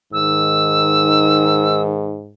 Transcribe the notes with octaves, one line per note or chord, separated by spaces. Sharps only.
G#2 D#3 E6